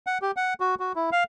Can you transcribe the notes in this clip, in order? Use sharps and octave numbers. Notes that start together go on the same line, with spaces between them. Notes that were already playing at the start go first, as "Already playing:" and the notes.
F#5
G4
F#5
F#4
F#4
E4
F5